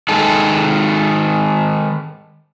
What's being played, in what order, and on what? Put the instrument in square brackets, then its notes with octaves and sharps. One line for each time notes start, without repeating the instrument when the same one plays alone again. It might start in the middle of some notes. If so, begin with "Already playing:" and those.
[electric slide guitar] D#3 G#3 A4